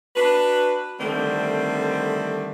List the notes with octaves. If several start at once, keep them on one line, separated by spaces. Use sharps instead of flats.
D4 F#4 B4
D3 D#3 G3 A3 C4